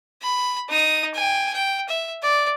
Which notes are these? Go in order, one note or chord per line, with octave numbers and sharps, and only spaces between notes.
B5
D#4 D#6
G5 G#5
G5
E5
D5